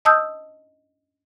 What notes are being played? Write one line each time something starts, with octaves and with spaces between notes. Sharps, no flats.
D#5 A5 D#6 E6 G6